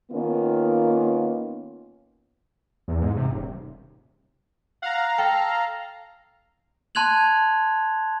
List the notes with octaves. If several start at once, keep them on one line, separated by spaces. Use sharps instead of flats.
D#3 A#3 B3 C#4 F4
E2
G#2
C3
D#1
F5 F#5 A#5
A4 G5
A5 C6 F#6 G#6 F7 F#7